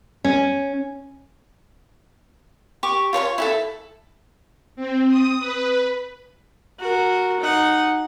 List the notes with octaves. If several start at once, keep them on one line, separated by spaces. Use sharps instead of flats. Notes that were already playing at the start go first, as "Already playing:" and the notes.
C#4
G4 C#6 D6
F4 C#5 A5 C#6
E4 G4 A4
C4
D#6
B4
F#4 A#4
D#4 F#5